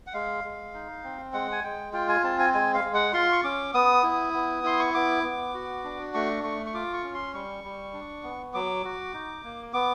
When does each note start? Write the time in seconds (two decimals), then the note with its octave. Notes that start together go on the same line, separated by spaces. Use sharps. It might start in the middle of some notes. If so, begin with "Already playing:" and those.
0.07 F#5
0.13 G#3 F5
0.44 G#3
0.74 D#4
1.04 C4
1.33 G#3 F#5
1.52 G#5
1.64 G#3 G5
1.93 F4 G5
2.09 G#5
2.24 C4 A5
2.39 G#5
2.54 G#3 G#5
2.74 F5
2.84 G#3
2.94 F#5
3.13 F4 C6
3.32 C#6
3.44 C#4 D6
3.74 B3 D#6
4.03 E4
4.34 B3
4.64 E4 C6
4.79 C#6
4.94 B3 D6
5.24 B3
5.54 F#4
5.84 D4
6.14 A3 C#6
6.43 A3 C#6
6.66 C#6
6.74 F4 D6
6.93 C#6
7.03 C#4
7.14 C6
7.33 G3 C#6
7.64 G3
7.93 D4
8.23 B3
8.54 F#3 D6
8.84 F#4
9.13 D#4
9.44 A#3
9.73 B3 D6